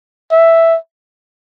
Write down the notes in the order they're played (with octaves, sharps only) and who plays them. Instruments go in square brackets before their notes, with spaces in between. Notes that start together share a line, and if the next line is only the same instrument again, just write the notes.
[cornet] E5